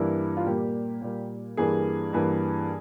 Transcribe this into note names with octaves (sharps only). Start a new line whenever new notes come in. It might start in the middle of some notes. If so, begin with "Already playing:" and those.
Already playing: G2 E3 A#3 E4
F4
A#2 G3 A#3 G4
A#2 G3 A#3
G2 E3 A#3 G#4
G2 E3 A#3